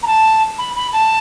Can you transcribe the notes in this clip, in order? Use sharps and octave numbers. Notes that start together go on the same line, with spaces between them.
A#5
A5
B5
B5
A5